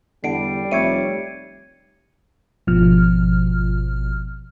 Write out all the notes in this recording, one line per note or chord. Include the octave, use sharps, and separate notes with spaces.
E2 D3 G3 C7 D7
F1 C#5 D5 E5 G#6 C#7 D#7
G#1 B2 F3 F6